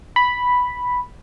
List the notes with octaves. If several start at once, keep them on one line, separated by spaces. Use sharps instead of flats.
B5